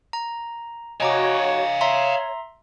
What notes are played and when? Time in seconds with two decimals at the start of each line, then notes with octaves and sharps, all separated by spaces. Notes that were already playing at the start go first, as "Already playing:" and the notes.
0.13 A#5
1.00 F#4 C#5 D#5 F5 G#5 A#5 D6
1.81 C#5 E5 A#5 C6